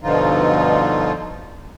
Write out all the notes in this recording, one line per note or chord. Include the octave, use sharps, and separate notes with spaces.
G2 B2 D3 F3 D#4 F4